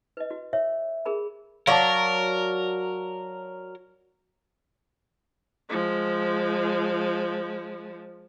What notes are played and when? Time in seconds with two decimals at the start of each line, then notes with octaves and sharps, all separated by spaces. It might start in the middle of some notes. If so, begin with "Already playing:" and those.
0.17 B4 D#5
0.31 F#4
0.53 C#5 E5
1.06 G#4 A#4 B5
1.67 F#3 A#4 D5 F5 A5
5.70 F3 G#3